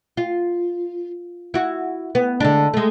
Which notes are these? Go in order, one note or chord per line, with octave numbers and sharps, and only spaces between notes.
F4
E4 F#4
B3
D3 G#3 D4
G#3 A3